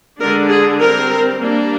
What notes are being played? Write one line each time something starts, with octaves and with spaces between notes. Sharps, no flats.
D3 G#3 D4 A#4
G#4
G3 C4 A#4
G3 A#3 D4